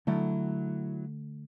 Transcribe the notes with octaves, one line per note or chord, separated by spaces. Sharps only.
D3 F#3 A3 E4